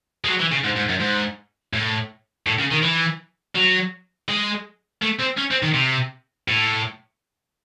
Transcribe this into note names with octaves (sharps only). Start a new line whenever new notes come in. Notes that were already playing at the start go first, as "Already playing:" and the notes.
G#3
F#3
E3
C#3
G#2
G#2
F#2
G#2
A2
A2
C#3
D#3
E3
F#3
G#3
A3
C4
C#4
C4
D#3
C3
A2